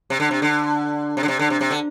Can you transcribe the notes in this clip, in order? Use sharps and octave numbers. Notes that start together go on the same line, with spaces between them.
C3
D3
C3
D3
C3
D3
C3
D3
C3
C3
D3